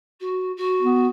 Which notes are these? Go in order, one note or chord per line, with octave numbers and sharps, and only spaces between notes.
F#4
F#4
B3